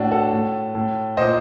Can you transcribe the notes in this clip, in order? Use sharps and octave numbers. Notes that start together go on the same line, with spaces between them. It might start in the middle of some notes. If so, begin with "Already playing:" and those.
Already playing: A2 D4 F#4
F#4 A4
A2
A2
A#2 C5 D#5